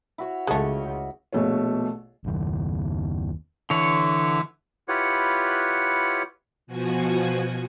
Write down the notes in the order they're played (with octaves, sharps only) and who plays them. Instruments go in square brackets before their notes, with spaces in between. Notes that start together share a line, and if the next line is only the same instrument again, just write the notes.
[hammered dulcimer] E4 F#4 C#5
[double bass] C#2 C#3 [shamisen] G#3 A3 [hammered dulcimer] C#6
[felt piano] A#1 B2 A3 A4 C#5
[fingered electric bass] F#1 D#2
[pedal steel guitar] D3 C#5 [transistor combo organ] E3
[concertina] E4 F4 G4 B4 C#5 F#5
[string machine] B2 F3 F#4 G#5